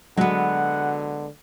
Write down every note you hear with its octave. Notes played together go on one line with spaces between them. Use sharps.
D3 F#3 G#3 B3 F#5